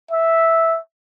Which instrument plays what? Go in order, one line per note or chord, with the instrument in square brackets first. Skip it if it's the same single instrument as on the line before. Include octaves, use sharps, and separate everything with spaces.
[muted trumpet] E5